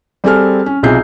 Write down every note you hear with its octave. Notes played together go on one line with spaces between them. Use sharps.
G3 C4 G#4 A4 G#5 F6
C#4
B1 C3 F4 G#4 G6 C7